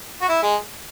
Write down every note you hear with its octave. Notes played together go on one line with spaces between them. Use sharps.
F#4
E4
G#3